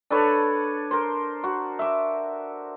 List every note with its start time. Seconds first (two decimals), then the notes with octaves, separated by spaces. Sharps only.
0.11 D4 A4 B4 C#5
0.91 A#4 C5
1.44 F#4
1.79 E5 D6